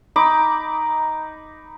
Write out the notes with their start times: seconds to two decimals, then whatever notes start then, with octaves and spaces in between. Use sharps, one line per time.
0.16 D#4 B5 D6